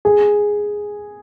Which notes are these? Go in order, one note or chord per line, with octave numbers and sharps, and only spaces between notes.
G#4